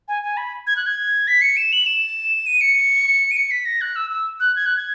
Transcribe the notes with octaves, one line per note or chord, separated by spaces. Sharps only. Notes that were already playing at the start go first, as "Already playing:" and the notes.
G#5
G#5
B5
G#6
F#6
G#6
B6
C#7
E7
F#7
E7
D#7
C#7
D#7
C#7
B6
A#6
F#6
E6
E6
F#6
G#6
F#6
G#6